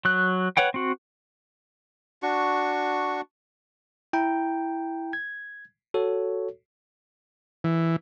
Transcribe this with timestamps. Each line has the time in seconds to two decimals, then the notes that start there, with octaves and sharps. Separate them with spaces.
0.05 F#3 F#6
0.57 B4 C#5 F#5 G5
0.74 C4 F#4
2.23 D4 F#4 C#6
4.13 E4 G5 A#5
5.13 G#6
5.94 F#4 A4 C#5
7.64 E3